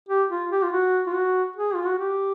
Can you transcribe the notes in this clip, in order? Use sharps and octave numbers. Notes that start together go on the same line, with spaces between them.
G4
F4
G4
F4
F#4
F4
F#4
G#4
F4
F#4
G4